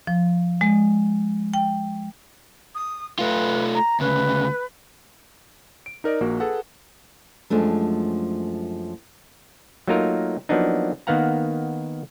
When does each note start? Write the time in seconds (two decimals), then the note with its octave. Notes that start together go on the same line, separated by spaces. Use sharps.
0.07 F3
0.61 G#3
1.54 G5
2.75 D#6
3.19 A3 F4 B4
3.74 A#5
4.00 D2 C#3 B4
5.86 D7
6.04 D#4 A#4 D5 D#5
6.20 A#1 A#3 F#4
6.40 G#4 A4 B4 F#5
7.50 F#2 F3 G#3 A3 D4
9.87 F#3 A3 A#3 D#4 F4 A#4
10.49 F3 F#3 A#3 B3 D4 D#4
11.07 D#3 A#3 B3 F5 F#5 A#5